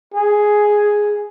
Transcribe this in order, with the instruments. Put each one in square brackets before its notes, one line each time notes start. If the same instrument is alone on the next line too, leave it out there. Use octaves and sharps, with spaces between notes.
[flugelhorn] G#4